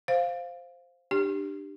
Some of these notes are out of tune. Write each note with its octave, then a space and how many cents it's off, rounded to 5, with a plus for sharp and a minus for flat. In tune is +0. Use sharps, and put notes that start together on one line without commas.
C5 +0 F5 +0
D4 +25 G4 +0